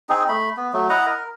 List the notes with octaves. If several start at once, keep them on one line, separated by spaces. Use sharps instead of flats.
C4 D#4 G#4
A3 B5
B3
F#3 A3
E4 D#5 F#5 A#5
A#4